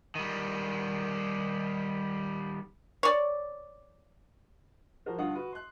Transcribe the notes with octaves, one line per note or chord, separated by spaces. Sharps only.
D#3 G3
C#5 D5
F3 F#4 A#4 C5
G2 D3 F4 F5 F#5 D#6
F#4 B4
C6 F#6